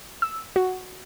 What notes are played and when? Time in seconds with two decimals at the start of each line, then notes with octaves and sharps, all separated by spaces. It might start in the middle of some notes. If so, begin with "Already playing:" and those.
0.22 E6
0.56 F#4